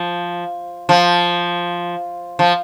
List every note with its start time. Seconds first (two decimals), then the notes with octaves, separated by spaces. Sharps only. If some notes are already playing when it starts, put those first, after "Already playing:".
Already playing: F3
0.89 F3
2.39 F3